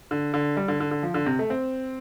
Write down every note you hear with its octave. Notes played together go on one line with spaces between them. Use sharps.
D3
D3
G3
D3
D3
D3
F3
D3
C3
A3
C4